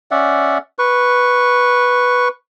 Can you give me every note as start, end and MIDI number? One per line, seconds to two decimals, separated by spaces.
0.11 0.58 61
0.11 0.58 74
0.11 0.58 76
0.11 0.58 78
0.79 2.28 71
0.79 2.28 85